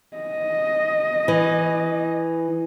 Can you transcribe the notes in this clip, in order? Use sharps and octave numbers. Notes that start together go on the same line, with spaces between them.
D#5
E3